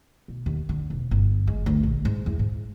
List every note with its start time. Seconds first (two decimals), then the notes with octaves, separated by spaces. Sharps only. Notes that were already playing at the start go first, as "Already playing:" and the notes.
0.28 B2
0.46 D#2
0.69 D3
0.90 E1
1.11 G1
1.47 G#3
1.66 D2
1.83 A#1
2.05 G#2
2.26 E2
2.39 G#2